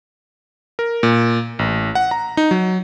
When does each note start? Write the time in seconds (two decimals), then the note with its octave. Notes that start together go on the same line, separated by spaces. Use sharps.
0.79 A#4
1.03 A#2
1.59 A1
1.95 F#5
2.11 A#5
2.37 D#4
2.51 F#3